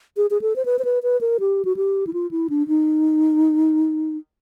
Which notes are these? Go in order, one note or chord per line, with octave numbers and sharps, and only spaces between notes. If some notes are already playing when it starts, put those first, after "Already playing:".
G#4
G#4
A4
C5
B4
C5
B4
B4
A#4
G4
F#4
G4
E4
F4
E4
D4
D#4